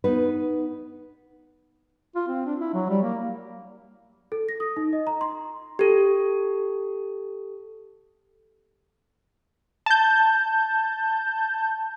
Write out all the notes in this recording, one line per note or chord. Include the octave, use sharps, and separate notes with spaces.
B3 D#4 B4
F4
C4
D4
E4
F#3
G3
A#3
A4
A#6
D#6
D#4
D#5
A#5
C6
G4 A4
A5 G6